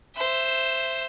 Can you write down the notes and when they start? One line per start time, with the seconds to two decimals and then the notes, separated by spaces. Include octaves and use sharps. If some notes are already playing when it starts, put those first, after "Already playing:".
0.16 C5 E5